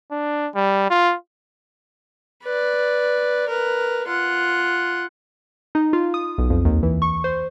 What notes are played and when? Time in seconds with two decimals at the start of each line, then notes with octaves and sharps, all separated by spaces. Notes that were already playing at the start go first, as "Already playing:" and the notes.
0.11 D4
0.55 G3
0.90 F4
2.44 B4 D5
3.48 A#4 B4
4.07 F4 F#5
5.75 D#4
5.93 F4
6.14 D#6
6.38 B1
6.50 F2
6.65 D#2
6.83 E3
7.02 C#6
7.24 C5